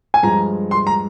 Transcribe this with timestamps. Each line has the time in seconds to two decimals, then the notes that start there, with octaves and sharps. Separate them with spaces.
0.14 G#5
0.23 G2 F3 G#3 A#5
0.71 C6
0.87 A#5